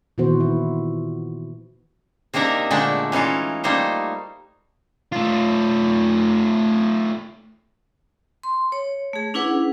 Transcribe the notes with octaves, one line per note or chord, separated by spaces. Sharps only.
A#2 D#3 E3 B3 F#4 C5
E4
C3 A#3 D4 D#4 A#4 E5
A#2 D3 G#3 A3 D4 G5
E3 C#4 D#4 F4
G3 A3 A#3 D#4 C5
A3 F4
C6
C#5
A3 G#4
C#4 D4 E4 G#4 B4 F#5